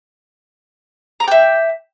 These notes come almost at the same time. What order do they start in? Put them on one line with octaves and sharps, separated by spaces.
A#5 D6 G5 E5